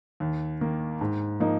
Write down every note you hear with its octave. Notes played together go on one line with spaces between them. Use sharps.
D#2
D#3 A#3
G#2
F3 A#3 D#4